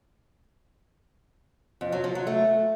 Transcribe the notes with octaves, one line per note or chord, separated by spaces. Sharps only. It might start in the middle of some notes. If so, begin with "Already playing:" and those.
F2
F#3
F3
F#3
A3